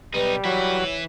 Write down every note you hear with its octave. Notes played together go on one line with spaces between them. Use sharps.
B1 G3 D#4 B4
E3 F#3 E4 C#5